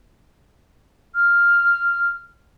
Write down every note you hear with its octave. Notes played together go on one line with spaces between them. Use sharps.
F6